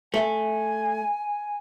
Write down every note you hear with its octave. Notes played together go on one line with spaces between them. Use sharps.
A3 G#5